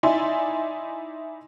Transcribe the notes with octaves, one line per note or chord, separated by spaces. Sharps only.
D#4 E4 D5 E5 G#5 C6